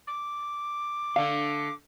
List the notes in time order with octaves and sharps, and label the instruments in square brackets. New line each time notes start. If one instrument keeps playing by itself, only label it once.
[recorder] D6
[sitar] D3 A3 [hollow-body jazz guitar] F5